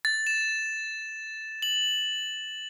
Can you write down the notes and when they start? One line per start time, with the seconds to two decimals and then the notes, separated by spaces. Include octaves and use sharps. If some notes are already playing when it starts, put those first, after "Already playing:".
0.05 A6
0.27 E7
1.62 F#7